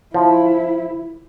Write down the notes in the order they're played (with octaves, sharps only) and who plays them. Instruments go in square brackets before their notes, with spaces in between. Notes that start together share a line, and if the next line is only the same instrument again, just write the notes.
[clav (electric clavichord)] F3 [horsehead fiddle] E4